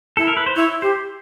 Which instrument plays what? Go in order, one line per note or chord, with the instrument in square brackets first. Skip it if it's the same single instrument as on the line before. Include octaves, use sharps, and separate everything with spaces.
[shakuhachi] E4 [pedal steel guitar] A4
[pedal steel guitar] A#4
B4
C5
[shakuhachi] E4 [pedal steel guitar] C#5
[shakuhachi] G4 [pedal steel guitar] C5